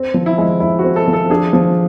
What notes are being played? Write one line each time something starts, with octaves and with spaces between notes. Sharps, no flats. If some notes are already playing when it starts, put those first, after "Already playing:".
Already playing: C4
F3
E4
G#3
E4
C4 F#4
A4
F3
A4
D4 G#4
F3